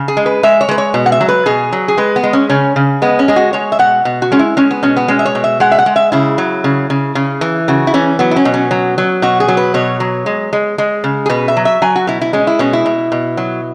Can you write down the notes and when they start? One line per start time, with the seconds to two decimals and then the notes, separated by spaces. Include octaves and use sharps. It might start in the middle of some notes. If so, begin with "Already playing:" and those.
Already playing: C#3
0.08 G#4
0.17 G#3
0.26 B4
0.43 G#3 E5
0.61 C#5
0.69 G#3 B4
0.78 C#5
0.94 B2
1.06 F#5
1.12 E5
1.21 F#3
1.29 B4
1.46 B2 G#4
1.72 F#3
1.88 G#4
1.98 G#3 B4
2.16 B3
2.23 G#3
2.33 C#4
2.50 C#3 C#4
2.76 C#3
3.02 G#3 B3
3.19 C#4
3.28 G#3 G#4
3.36 F#4
3.53 G#3 C#5
3.72 E5
3.79 B2 F#5
4.05 B2
4.22 F#4
4.32 G#3 C#4
4.39 E4
4.57 G#3 C#4
4.71 B3
4.83 B2 C#4
4.97 B3
5.08 G#3 C#4
5.19 E5
5.26 C#5
5.35 B2
5.44 E5
5.60 G#3 F#5
5.71 E5
5.78 F#5
5.86 G#3
5.96 E5
6.12 C#3 E4
6.38 F#3
6.64 C#3
6.90 C#3
7.15 C#3
7.41 E3
7.68 C#3 F#4
7.87 E4
7.94 E3 C#4
8.19 F#3 B3
8.31 E4
8.36 C#4
8.45 B2
8.54 C#4
8.71 F#3
8.98 F#3
9.22 B2 F#4
9.40 G#4
9.48 F#3
9.57 B4
9.74 B2 C#5
10.00 F#3
10.26 G#3
10.53 G#3
10.78 G#3
11.04 C#3
11.26 G#4
11.30 B2 B4
11.48 E5
11.57 F#3
11.65 E5
11.82 F#3 G#5
11.96 F#4
12.07 B2 E4
12.21 E4
12.33 G#3 C#4
12.47 E4
12.59 B2 C#4
12.73 E4
12.86 B2
13.12 B2
13.37 F#3